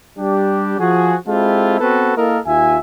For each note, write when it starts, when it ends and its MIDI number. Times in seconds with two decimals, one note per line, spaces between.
0.19 0.77 55
0.19 0.77 62
0.19 0.77 67
0.79 1.16 53
0.79 1.16 66
0.79 1.16 68
1.28 1.79 56
1.28 1.79 60
1.28 1.79 64
1.28 1.79 65
1.28 1.79 67
1.28 1.79 69
1.80 2.15 59
1.80 2.15 60
1.80 2.15 66
1.80 2.15 69
1.80 2.15 71
2.17 2.39 58
2.17 2.39 64
2.17 2.39 69
2.17 2.39 70
2.17 2.39 75
2.17 2.39 77
2.46 2.78 39
2.46 2.78 65
2.46 2.78 76
2.46 2.78 80